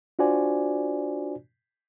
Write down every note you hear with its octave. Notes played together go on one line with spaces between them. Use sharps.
D4 F4 F#4 C5 D5 G#5